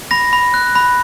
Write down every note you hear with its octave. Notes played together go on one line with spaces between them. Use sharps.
B5 A#6
B5
F#6
B5